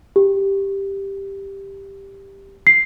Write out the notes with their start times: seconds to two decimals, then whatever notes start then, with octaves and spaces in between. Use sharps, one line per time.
0.16 G4
2.67 C7